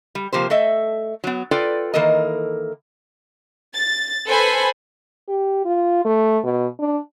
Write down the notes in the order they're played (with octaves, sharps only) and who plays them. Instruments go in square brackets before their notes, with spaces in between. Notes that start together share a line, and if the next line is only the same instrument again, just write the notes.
[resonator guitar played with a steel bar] G3
C3 F3 A#3 G4 C5
A3 A4 D#5 E5
F#3 B3
F4 A4 B4 D5 G5
D#3 E3 A#3 A4 A#4 D#5
[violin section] A6
A4 B4 C5 G#5 B5
[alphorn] G4
F4
A3
B2
D4